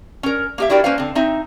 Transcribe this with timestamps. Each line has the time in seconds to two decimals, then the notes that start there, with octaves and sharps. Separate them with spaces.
0.23 C#4 A#4
0.58 A#3 G4 E5
0.69 D4 E4 F#4 G4 A#4 D5
0.84 A#3 C#4 B4 C5 F5
0.98 D3 C4
1.15 C4 D#4 E5